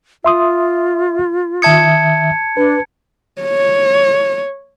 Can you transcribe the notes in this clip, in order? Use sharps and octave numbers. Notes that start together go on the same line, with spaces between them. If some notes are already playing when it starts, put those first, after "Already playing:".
F4 E5 C6 D#6
D#3 E5 A5 D#6 G#6 C#7
D4 B4
C#5